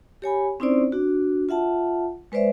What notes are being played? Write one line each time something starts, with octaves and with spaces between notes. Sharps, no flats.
G4 C#5 G#5 B5
C4 C#4 D#4 E4 C5 D5
D4 F#4
F4 E5 F#5 A5
G#3 B4 C5 D5 E5